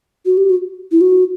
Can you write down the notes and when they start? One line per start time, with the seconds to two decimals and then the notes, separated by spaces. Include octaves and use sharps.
0.26 F#4
0.37 G4
0.50 F#4
0.92 E4
1.01 F#4